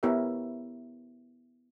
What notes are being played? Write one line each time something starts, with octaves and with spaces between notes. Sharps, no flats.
B3 E4 G4 A#4 C#5 E5